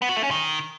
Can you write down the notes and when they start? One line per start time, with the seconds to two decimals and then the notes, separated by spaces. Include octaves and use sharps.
0.02 B3
0.09 F#4
0.16 A3
0.24 C#4
0.31 D#3